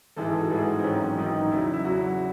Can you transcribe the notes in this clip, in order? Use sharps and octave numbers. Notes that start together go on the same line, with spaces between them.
A1 G#2 E3 G#3 A4
F#4
A1 G#2 E3 G#3 G#4
C4
A1 G#2 D#3 F#3 C#4
A1 G#2 D#3 F#3 D#4
E2 C#3 F#3 E4
E4
E2 C#3 F#3 F#4